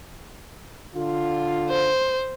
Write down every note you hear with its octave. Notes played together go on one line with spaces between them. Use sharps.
D3 F4
C5